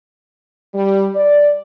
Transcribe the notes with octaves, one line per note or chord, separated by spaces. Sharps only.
G3
D5